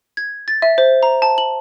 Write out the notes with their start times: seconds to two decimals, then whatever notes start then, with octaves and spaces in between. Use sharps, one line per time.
0.17 G#6
0.48 A6
0.62 E5
0.78 C5
1.03 A#5
1.22 A5
1.38 F#7